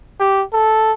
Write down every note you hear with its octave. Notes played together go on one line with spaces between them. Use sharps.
G4
A4